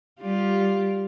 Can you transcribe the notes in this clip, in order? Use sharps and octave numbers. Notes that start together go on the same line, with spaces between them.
G3 F4 G4